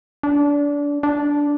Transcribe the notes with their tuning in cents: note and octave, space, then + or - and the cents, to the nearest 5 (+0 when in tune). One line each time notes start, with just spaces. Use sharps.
D4 -25
D4 -10